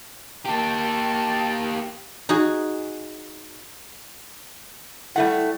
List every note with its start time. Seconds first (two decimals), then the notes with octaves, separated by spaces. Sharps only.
0.46 A#3 G4 A5
2.29 D#4 F#4 G#4
5.16 G3 A3 E4 F#5